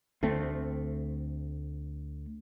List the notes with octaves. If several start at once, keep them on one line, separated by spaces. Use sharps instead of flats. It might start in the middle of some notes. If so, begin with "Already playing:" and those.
D2 A3 C4